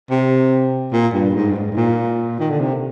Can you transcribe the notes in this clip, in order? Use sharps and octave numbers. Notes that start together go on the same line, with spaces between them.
C3
A#2
G2
G#2
G2
G#2
G#2
A#2
D#3
D3
C3